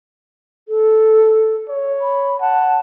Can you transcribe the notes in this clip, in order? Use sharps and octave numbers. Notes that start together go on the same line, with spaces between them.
A4
C#5
B5
F#5 A5